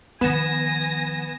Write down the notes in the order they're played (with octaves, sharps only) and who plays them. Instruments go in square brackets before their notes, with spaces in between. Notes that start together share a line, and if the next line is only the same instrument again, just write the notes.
[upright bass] D#3 F3 [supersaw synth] B3 E7 [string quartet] G#5 A#6